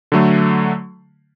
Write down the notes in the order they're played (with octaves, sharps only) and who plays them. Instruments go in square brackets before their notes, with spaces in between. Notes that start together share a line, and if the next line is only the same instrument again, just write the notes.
[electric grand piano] D3 F#3 A3